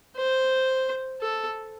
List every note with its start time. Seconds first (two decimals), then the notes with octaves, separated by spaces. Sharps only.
0.17 C5
1.21 A4